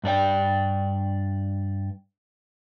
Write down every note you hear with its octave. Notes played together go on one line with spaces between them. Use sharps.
G2 D4 D5 G5